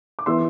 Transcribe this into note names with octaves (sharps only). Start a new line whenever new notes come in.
D6
E3 B3 C6 E6